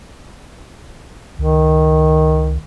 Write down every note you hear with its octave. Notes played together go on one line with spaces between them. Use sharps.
C#2 D#3